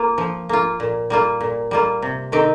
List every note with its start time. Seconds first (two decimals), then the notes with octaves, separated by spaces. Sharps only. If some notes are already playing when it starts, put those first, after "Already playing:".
Already playing: A#3 F4
0.18 F3
0.49 A#3 F4
0.80 A#2
1.10 G3 A#3 F4
1.41 A#2
1.71 G3 A#3 F4
2.02 C3
2.32 D#3 C4 D#4 G4